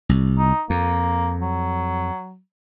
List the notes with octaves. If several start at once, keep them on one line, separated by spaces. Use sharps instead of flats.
C2
D#4
F2 A#3
F#3